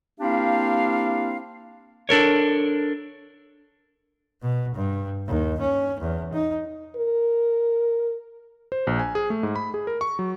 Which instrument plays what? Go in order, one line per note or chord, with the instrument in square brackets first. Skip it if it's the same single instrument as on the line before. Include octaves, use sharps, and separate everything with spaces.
[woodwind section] A#3 C4 D4 E4 G4 F5
[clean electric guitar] D4 A4 A#4 C#5
[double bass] B2
G2
D#2
C#4
E2
D#4
[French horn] A#4
[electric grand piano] C5
A#1
G#5
G#4
A3
G#2
B5
G#4
A#4
C#6
F#3